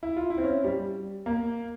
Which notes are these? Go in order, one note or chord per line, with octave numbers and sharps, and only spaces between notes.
E4
F4
E4
C4
C#4
G3
A#3